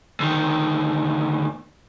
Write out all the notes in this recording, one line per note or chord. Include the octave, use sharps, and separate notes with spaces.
D2 D#3